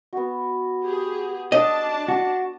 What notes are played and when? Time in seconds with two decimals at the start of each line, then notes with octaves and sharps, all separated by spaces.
0.13 B3 F#4
0.83 G4 G#4
1.52 D4 D#5 A5
2.08 F#4